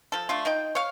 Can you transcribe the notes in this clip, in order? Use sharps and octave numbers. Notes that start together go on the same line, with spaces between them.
F3 A4
A3 D4 F4
D#4 G5
C#5 F5